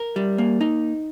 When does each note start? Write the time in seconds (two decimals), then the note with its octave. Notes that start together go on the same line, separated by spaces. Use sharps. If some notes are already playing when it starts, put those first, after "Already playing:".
Already playing: A#4
0.16 G3
0.38 A#3
0.61 D#4